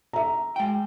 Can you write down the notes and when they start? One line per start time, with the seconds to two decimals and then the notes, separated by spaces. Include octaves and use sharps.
0.13 E5 A#5
0.56 G#3 G5